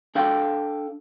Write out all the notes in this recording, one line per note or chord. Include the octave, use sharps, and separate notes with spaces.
D4 A4 F5 G5